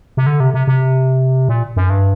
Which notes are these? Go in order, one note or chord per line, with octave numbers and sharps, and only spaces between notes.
C3
D3
C3
C3
C3
A#2
F#2
G2